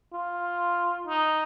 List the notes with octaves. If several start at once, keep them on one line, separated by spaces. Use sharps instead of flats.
F4
D#4